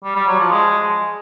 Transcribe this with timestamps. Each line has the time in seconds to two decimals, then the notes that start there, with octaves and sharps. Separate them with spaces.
0.04 G3
0.16 G3
0.27 F#3
0.39 F3
0.51 G#3